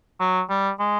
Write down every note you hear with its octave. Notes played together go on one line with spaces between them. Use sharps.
F#3
G3
G#3